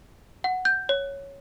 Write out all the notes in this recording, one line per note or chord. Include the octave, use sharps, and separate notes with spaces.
F#5
G6
C#5